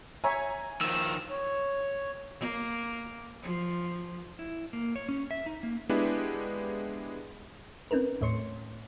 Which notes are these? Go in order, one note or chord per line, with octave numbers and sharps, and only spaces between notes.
C#5 E5 G#5 A#5 G#6
D#3 F3 E6
C#5
A#3
F3
E4
A#3
C#5
C#4
E5
D#4
A#3
G#3 B3 D4 E4 G4
C4 C#4 D#4 A#4 B4
D#2 A2 A3 C#5 C6 C#7